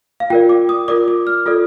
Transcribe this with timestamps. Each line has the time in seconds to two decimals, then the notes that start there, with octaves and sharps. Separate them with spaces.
0.20 F5
0.30 F4 A#4 D5 G5
0.49 D6
0.69 D#6
0.88 F4 A#4 D5 D6
1.08 D6
1.27 F6
1.46 F4 A4 D5 D#6